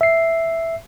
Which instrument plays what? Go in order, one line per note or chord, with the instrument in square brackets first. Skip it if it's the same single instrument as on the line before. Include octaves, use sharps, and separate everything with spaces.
[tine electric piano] E5 C7